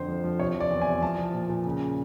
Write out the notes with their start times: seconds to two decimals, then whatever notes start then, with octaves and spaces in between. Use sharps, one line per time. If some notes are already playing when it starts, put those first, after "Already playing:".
Already playing: F2 D3 C5
0.08 F3
0.24 F3
0.40 C3 C#5
0.55 F3
0.60 D5
0.70 E2
0.81 G#5
0.87 C3
1.02 F3 A5
1.18 F3
1.34 A#2
1.49 A#2
1.65 C#3